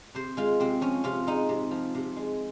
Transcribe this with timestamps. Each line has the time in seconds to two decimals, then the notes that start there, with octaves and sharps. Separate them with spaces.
0.15 C3 C5
0.37 G#3 F4
0.60 C3 C4
0.81 F3 C#4
1.04 C3 F4
1.27 G#3 D#4
1.49 C3
1.71 F3
1.95 C3
2.16 G#3